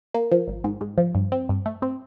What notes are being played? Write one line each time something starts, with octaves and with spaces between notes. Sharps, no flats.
A#3
F3
G#1
G#2
G#2
F3
G2
C4
G2
A3
C4